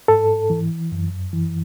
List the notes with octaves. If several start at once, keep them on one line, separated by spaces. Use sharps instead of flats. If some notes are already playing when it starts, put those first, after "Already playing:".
G#2 A4
E3
F#2
E3